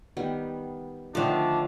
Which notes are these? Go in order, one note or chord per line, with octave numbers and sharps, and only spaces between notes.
D#3 G3 B3
D3 D#3 F3 A3 D4